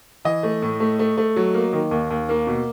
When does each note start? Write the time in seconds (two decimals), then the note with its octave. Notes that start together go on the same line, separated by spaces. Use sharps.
0.25 E3 D#5
0.43 A3
0.62 A2
0.80 A3
0.99 A3
1.17 A3
1.36 F#3
1.54 A#3
1.73 D#3
1.91 D#2
2.10 D#2
2.29 A#3
2.47 B2